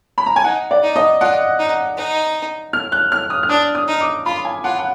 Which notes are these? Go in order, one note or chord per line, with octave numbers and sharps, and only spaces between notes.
B5
A#5
G#5
D#4 F#5
D5
D#4
D#5
F4 F#5
D#4
D#4
F6
F#6
F6
D#6
F6
D4 D#6
D#6
D#4
D6
F4 B5
G#5
F4 F#5
F#5